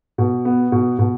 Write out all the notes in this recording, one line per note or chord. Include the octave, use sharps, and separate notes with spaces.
B2
B3
B2
B2